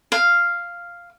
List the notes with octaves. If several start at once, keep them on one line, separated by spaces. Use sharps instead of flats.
F5